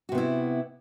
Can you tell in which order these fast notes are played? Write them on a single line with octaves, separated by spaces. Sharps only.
F#4 C3 B3 E4